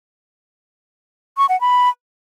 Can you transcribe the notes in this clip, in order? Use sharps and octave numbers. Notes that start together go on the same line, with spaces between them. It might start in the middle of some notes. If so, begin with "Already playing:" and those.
C#6
F#5
B5